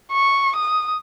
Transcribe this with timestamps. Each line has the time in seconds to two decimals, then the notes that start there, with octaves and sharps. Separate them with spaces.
0.12 C#6
0.56 D#6